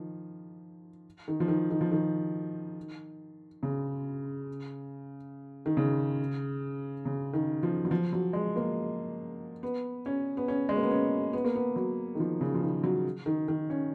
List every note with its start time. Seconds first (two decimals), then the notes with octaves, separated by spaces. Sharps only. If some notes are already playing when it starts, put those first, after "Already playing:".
Already playing: D#3 F3
1.28 D#3
1.40 F3
1.48 D#3
1.70 D#3
1.81 F3
1.92 D#3
3.63 C#3
5.66 D#3
5.77 C#3
7.05 C#3
7.33 D#3
7.63 F3
7.85 F#3
7.91 F3
8.13 F#3
8.33 G#3
8.56 A#3
9.63 B3
10.06 C#4
10.37 B3
10.48 C#4
10.69 G#3
10.77 A#3
10.83 B3
10.91 C#4
11.33 B3
11.44 A#3
11.55 B3
11.76 F#3
12.15 D#3
12.20 F3
12.41 C#3
12.54 F3
12.62 D#3
12.84 F#3
13.26 D#3
13.48 D#3
13.70 C#4